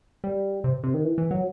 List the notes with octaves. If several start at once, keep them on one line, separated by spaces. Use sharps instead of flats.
G3
C3
C3
D#3
E3
E3
F#3